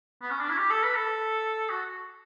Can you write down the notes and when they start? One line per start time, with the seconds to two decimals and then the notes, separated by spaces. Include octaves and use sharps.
0.22 B3
0.30 C#4
0.40 D4
0.49 E4
0.58 G4
0.70 A4
0.83 B4
0.95 A4
1.70 F#4